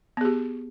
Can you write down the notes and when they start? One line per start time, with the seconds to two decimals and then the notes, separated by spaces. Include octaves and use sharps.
0.17 B3
0.21 G#4
0.25 G4